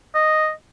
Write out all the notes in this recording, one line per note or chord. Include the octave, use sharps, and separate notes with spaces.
D#5